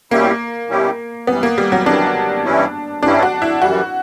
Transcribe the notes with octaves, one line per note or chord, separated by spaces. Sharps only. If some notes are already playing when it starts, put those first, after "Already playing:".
B2 G3 A#3 C#4 E4 G4
B2 G3 C#4 E4 G4
F#2 E3 G3 B3
A#3
G3
F#3
F#2 E3 G3 D4
G2 E3 G3 C#4 E4
G2 E3 G3 C#4 D4 E4
F#4
E4
F#2 E3 G3 F#4